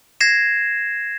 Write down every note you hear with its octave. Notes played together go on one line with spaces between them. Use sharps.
G#6 A#6 C7 E7